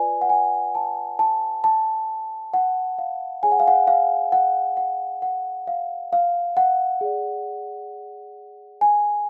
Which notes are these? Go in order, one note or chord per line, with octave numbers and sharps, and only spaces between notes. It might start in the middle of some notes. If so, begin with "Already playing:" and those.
Already playing: F4 B4 D5 G#5
F#5
G#5
A5
A5
A5
F#5
F5
G#4 C#5 G#5
F#5
F5
F#5
F5
F#5
F#5
F#5
F5
F5
F#5
G#4 D5
G#5